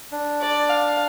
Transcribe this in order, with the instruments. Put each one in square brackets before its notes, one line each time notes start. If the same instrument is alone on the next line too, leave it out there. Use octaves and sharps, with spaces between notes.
[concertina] D4
[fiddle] D5
F5